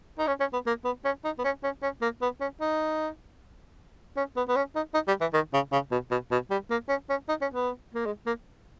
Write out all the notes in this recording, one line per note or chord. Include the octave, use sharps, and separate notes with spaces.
D#4
C#4
C#4
B3
A#3
B3
C#4
D#4
B3
C#4
C#4
C#4
A#3
B3
C#4
D#4
C#4
B3
B3
C#4
D#4
D#4
G3
E3
D#3
C#3
C#3
B2
B2
B2
G3
A#3
C#4
C#4
D#4
C#4
B3
A#3
G#3
A#3